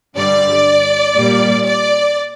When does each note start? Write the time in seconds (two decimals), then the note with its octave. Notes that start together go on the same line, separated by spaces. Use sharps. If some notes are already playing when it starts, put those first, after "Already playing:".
0.16 G2 D3 G3 D5
1.15 A#2 G3 A#3
1.65 D5